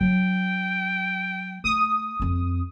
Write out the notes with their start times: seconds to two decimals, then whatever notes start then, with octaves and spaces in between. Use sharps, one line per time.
0.01 F#3 D4 G5
1.64 A3 D#6
2.20 F2 C4